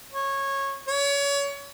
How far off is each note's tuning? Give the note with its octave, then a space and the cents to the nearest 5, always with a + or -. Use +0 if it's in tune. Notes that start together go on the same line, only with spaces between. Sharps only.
C#5 -15
C#5 +30